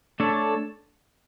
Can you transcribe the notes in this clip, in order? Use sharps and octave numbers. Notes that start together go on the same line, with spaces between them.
A3 D4 A4 C#5